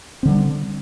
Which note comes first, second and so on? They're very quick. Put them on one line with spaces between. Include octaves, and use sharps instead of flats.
C4 D3 G3